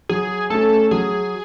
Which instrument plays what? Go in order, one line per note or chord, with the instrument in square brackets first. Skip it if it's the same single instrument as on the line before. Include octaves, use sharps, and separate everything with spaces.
[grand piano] F#3 [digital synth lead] G#4
[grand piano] A3 C#4 [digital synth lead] A4
[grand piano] F#3 [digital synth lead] G#4